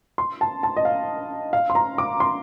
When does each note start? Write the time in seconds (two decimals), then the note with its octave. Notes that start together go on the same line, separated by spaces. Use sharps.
0.18 C6
0.41 A5
0.63 A5
0.77 D#5
0.85 F5
1.53 F5
1.70 C6
1.75 A#5
1.98 D6
2.20 C6